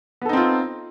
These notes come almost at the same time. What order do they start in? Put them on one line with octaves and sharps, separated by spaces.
B3 A4 D#4 C4 F4